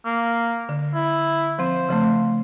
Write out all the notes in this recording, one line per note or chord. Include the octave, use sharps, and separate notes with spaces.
A#3
D3
E4
F3 C4 C5
C#3 F3 A3